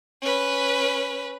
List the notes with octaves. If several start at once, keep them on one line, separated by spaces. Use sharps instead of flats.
C#4 B4